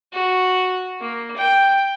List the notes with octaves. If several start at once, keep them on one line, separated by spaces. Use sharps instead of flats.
F#4
A#3
G5